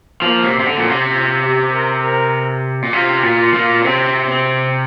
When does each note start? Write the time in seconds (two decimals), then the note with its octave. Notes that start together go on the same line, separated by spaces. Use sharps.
0.21 F3 A#3
0.44 C3
0.60 C3
0.66 D3 C4
0.78 A#2
0.90 C3
1.12 F4
1.42 G4
1.73 A#4
2.03 A#4
2.82 A#2
2.93 C3 F4
3.23 A#2
3.39 F4
3.54 A#2
3.84 C3 C4
4.29 C4